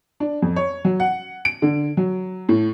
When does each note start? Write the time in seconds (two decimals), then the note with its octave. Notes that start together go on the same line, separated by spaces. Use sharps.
0.20 D4
0.42 F2
0.56 C#5
0.85 F#3
1.00 F#5
1.45 D7
1.62 D3
1.97 F#3
2.49 A2